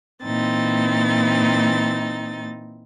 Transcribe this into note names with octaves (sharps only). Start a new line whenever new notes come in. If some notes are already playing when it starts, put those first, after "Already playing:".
A#2 E3 C4 D#4 A6